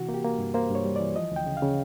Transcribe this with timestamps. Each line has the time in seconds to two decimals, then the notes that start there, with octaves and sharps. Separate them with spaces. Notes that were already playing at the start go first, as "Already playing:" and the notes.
Already playing: C3 E3 F#4
0.09 A#3
0.14 G4
0.24 A#3
0.39 G2
0.54 A#3 C5
0.70 G2 C#5
0.85 G3
0.96 E3 D5
1.16 F3 D#5
1.32 D2 G5
1.46 C#3
1.57 F5
1.62 C#3